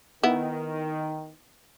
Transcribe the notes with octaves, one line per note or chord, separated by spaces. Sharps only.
D#3 B3 E4